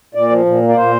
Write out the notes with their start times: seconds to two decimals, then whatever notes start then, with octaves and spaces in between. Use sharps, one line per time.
0.14 A#2 D5
0.30 F3
0.45 A#2
0.62 A#3
0.69 D5
0.77 A#2 C5